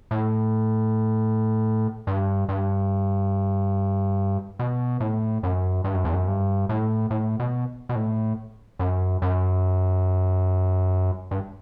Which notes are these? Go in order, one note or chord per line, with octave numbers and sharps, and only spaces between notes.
A2
G2
G2
B2
A2
F#2
G2
F#2
E2
F#2
G2
A2
A2
B2
B2
A2
F#2
F#2
G2